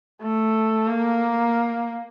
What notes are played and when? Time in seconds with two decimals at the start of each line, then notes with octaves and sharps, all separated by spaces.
0.22 A3
0.88 A#3